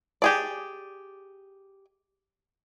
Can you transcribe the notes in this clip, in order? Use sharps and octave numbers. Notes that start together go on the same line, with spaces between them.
G4 G#4 D5